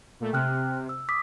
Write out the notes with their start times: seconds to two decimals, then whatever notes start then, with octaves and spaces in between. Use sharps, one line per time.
0.20 A#2 A3
0.33 C3 G5 F6 F#6
0.89 E6
1.09 D6 D#6 B6